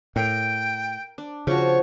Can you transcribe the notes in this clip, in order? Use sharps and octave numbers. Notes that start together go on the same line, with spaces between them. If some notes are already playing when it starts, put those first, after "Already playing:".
A2 A#4 G5
D4
C#3 F3 F#4 C#5